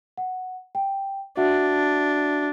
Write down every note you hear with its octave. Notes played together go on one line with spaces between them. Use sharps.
F#5
G5
D4 F#4 E5 F#5